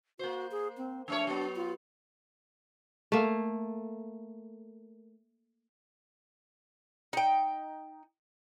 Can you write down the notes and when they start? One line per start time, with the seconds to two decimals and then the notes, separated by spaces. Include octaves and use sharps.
0.19 A#3 F#4 C5
0.51 G#4
0.77 C4
1.08 F3 A3 D4 C#5
1.27 F#3 B3
1.56 F4
3.12 A3 A#3
7.13 D#4 G5